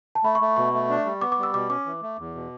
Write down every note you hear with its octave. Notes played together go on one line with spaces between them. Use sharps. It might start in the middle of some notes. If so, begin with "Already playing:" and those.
A5
A3 B5
C#6
A3
B2 C#6
A3
D4
G3
B3 D6
D6
G3 E6
B2 D6
C#4 D6
E3
A3
E2
B2